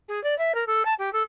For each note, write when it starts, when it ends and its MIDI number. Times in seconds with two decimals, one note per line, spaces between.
0.08 0.22 68
0.23 0.37 74
0.38 0.54 76
0.55 0.64 70
0.67 0.83 69
0.85 0.94 81
0.99 1.12 67
1.13 1.22 69